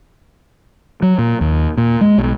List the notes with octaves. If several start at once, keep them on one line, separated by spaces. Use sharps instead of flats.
F#3
A#2
D#2
A#2
G#3
B1